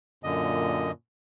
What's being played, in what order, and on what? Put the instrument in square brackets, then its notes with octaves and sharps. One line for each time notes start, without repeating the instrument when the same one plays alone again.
[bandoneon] F#2 D3 D#5 [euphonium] A#2